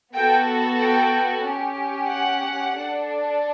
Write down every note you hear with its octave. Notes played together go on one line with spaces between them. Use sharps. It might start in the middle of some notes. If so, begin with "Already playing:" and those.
B3 F#4 A4 G5
G5
C#4 G4
F#5
D4 A4